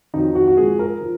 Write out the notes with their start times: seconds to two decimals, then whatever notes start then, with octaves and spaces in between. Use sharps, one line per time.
0.14 F2 D#3 F#3 D#4
0.35 F#4
0.48 F#4
0.57 G#2 F3 G#4
0.79 A#4
1.01 F3